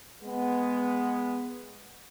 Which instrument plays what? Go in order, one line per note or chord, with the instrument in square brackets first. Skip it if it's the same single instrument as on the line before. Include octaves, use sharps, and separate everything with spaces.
[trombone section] G#3 B3